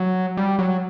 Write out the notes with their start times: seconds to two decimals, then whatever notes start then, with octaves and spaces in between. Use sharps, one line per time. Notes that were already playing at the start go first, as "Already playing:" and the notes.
Already playing: F#3
0.37 G3
0.59 F#3